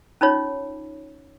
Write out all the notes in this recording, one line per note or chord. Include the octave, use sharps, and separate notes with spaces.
C#4 D#4 F4 C#5